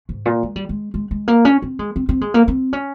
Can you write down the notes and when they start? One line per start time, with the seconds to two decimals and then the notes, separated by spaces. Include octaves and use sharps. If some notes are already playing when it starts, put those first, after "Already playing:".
0.09 G#2
0.26 A#2
0.43 G#3
0.56 G3
0.69 G#3
0.94 G#3
1.11 G#3
1.28 A#3
1.45 C#4
1.62 C4
1.79 G#3
1.96 C4
2.09 C4
2.21 G#3
2.34 A#3
2.48 C4
2.73 C#4